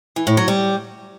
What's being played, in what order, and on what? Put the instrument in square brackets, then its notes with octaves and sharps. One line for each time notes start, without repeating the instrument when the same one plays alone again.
[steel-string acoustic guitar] E3
A2
F#3
G3